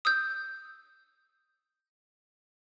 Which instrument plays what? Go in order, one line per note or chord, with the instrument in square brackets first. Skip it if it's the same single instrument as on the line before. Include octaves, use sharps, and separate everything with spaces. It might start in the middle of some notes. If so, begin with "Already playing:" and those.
[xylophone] D#6 E6 G6